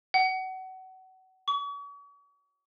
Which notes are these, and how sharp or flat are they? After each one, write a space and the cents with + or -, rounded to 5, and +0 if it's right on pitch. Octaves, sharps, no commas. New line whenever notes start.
F#5 +30
C#6 +40